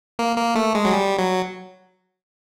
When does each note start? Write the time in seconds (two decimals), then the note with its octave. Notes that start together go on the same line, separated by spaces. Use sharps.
0.19 A#3
0.37 A#3
0.55 A3
0.75 G#3
0.85 F#3
0.93 G3
1.18 F#3